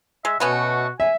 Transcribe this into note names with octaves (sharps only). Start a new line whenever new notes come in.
G#3 E5
B2 A3 B3 C#4 F#4
E5 G#5